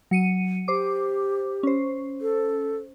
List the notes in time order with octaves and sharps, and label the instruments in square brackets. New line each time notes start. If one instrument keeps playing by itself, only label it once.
[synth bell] F#3 C#7 D#7
[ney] G4 [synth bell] C5 D6
[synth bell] C#4 C5
[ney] A4